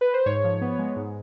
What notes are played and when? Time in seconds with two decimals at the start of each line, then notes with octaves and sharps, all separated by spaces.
0.01 B4
0.14 C5
0.26 G#2 C#5
0.44 F3
0.61 B3
0.79 G#3
0.96 G#2